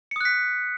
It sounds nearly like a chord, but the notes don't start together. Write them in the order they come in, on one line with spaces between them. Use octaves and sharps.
C#7 D#6 F#6 B6